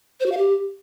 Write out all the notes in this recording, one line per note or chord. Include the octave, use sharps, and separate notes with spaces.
C5
F#4
F5
G4